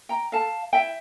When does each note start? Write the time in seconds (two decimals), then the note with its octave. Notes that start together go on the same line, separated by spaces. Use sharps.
0.09 G5 A#5
0.32 A4 F5 A5
0.73 E4 E5 G5